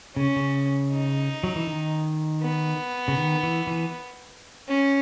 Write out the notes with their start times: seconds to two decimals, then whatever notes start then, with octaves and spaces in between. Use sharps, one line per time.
0.16 C#3 C#4
0.36 C#3
0.92 D#4
1.43 F#3
1.56 E3
1.67 D#3
2.42 B3
3.08 C#3
3.17 D#3
3.43 E3
3.67 E3
4.68 C#4